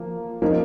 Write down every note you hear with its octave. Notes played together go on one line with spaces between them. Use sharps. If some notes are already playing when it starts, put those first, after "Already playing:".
Already playing: F3 A#3
F3 A#3 D#4